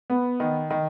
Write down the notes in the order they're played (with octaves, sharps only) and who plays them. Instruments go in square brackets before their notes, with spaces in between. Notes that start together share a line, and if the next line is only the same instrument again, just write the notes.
[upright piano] B3
D#3
D#3